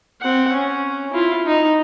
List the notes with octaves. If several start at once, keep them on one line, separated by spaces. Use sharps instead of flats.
C4 F#5
C#4
E4 F4
D#4